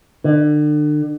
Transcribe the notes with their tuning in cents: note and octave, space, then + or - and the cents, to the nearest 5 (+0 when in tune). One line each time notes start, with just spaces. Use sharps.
D3 +35